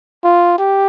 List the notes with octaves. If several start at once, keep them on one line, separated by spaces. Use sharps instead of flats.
F4
G4